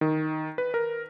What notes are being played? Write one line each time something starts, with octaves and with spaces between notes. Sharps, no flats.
D#3
B4
A#4